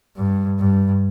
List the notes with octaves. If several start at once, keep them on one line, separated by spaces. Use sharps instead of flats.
G2
G2